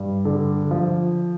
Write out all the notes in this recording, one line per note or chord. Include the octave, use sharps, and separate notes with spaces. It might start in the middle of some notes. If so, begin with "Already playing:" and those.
Already playing: G2
D3
F3